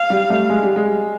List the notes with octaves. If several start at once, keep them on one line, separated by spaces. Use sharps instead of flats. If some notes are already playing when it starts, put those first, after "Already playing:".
Already playing: F5
G3
G3 A3
G#3
G3
G#3